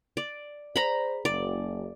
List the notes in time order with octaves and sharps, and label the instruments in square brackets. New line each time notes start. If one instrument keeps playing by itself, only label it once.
[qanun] D5
[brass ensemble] G#4 C5 D5 [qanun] A#5 B5
[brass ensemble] F#1 [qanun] D5